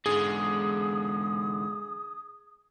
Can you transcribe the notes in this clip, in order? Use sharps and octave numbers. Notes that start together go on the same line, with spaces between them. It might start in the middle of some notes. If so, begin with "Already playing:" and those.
G#2 D3 G#4 D#6